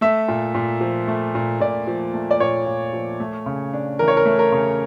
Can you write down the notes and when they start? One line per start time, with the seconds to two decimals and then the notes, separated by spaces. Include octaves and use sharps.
0.01 A3 E5
0.28 A#2
0.55 A#2
0.81 F3
1.08 A3
1.35 A#2
1.60 A#2 D5
1.87 F3
2.14 A3
2.31 D5
2.40 A#2 C#5
2.66 A#2
2.93 F3
3.20 A3
3.46 C#3
3.73 D4
3.99 E3 A#4
4.08 C#5
4.17 A#4
4.26 A3
4.39 A#4
4.52 C#3